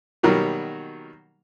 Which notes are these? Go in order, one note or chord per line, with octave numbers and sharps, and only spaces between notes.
B2 D#3 F#3 G3 A#3